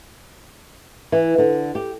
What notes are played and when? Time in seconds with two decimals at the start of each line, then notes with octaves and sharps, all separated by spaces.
1.12 E3
1.38 D3
1.75 G4